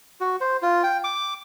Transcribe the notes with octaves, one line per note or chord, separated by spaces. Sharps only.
F#4
C5
F4
G5
D6